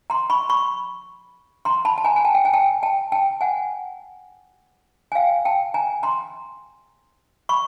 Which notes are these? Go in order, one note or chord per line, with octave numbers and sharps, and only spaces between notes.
A#5 C6
B5 C#6
B5 C#6
A#5 C6
A5 B5
A5
G#5 A#5
G#5
G5 A5
G5
G#5
G5 A5
G5 A5
G5 A5
F#5 G#5
G#5
F5 G5
G5 A5
G#5 A#5
A#5 C6
B5 C#6